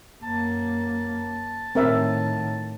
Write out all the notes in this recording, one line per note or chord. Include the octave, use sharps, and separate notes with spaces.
F#2 A#3 A5
A2 D#3 C4 A#4 E5